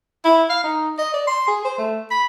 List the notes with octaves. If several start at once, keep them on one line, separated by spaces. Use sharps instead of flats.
E4
F5
D#4
D#5
D5
C6
G#4
C5
A3
B5